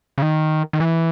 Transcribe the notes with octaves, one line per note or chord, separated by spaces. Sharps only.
C#3
D#3
D#3
E3